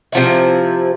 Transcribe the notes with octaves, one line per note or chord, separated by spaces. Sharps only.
C3 F3 E4